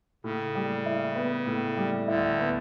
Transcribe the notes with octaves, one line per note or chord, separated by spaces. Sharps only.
A2 C#3
G3
E4
B3
A2
G3
D2 D3 E4
B3